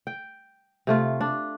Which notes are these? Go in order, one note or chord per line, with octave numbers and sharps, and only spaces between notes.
G5
C3 A3 F4
D4